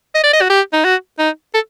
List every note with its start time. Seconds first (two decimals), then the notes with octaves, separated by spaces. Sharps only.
0.15 D#5
0.24 D5
0.33 D#5
0.41 F#4
0.50 G4
0.73 D#4
0.85 F#4
1.19 D#4
1.54 A4